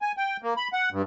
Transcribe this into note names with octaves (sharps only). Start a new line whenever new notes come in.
G#5
G5
A#3
B5
F#5
G2